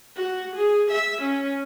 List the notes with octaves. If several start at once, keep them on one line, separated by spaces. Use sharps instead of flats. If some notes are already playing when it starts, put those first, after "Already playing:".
F#4
G#4
E5
C#4